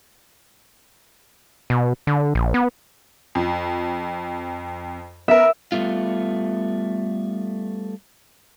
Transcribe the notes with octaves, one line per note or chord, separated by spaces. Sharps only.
B2
D3
A#1
B3
F2
B3 A#4 E5
G3 A3 B3 F4